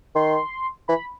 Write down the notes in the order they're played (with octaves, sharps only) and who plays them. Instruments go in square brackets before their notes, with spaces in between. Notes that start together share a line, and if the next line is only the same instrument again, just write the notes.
[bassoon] D#3 [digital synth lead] C6
[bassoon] E3 [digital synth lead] B5